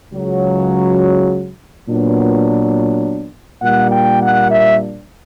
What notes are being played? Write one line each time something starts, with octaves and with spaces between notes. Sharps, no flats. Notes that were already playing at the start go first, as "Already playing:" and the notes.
C#2 C#3 F#3
A#2 F#3 B3 D4
A#2 G3 A#3 D4 F#5
G5
F#5
E5